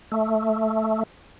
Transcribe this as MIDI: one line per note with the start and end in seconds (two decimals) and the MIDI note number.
0.12 1.03 57